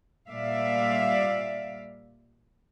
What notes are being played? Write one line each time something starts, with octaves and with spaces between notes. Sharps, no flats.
A#2 G3 D5 E5 F5